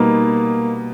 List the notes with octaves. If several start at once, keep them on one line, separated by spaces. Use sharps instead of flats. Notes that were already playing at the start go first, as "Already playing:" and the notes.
Already playing: B2 G3 A#3 B3 D#4